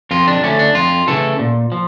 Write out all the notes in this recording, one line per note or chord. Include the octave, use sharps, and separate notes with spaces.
F2 F4
D4
D3 A3 C#4
D4
F2 F4
C#3 E3 A3 A4
A#2
F3